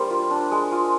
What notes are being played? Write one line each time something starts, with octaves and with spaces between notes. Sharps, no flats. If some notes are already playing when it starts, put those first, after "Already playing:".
Already playing: G3 A#3 D4 A#4 C5
F4
D4
G#3
F4